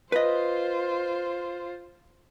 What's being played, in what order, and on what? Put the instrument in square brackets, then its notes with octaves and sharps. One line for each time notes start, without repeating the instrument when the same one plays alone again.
[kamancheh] F4 C5 [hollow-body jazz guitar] B4 D#5